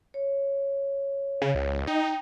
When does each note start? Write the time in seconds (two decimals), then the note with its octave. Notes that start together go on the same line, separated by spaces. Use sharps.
0.14 C#5
1.42 C#3
1.55 C#2
1.87 D#4 G5